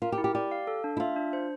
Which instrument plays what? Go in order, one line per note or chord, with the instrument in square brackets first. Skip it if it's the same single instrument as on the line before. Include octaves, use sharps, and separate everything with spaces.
[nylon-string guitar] F4 [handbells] A#4
[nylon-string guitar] G4
[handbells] E4
[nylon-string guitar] G4
[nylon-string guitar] G4 [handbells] D5
[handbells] F5
A4
D4
[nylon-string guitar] E4
[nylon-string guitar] F4 [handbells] E5
[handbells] D4
C5